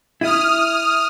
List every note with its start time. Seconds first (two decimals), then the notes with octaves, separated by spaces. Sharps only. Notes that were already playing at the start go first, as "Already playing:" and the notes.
0.21 E4 D#6 F6